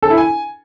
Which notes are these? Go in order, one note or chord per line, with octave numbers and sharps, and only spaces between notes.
A4
E4
G#5